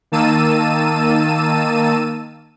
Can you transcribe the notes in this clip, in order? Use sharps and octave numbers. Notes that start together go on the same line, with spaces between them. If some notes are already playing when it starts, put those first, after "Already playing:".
D#3 A#3 A5 E6 D#7